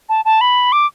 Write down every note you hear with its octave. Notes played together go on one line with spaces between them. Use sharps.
A5
A5
B5
D6